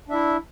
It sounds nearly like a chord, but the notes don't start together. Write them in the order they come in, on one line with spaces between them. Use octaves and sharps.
D4 E5 E4